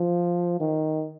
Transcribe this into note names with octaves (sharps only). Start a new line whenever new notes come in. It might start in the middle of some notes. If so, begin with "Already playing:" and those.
Already playing: F3
D#3